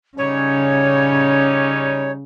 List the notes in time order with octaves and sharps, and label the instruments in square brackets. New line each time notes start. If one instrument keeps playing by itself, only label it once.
[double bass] C#3 [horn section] G3 C#4 D#4 [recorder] C#5